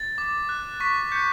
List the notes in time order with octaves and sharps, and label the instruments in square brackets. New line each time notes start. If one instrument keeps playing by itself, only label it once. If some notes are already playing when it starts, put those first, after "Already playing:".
Already playing: [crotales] A6
D6
F#6
C#6 B6
G6 C#7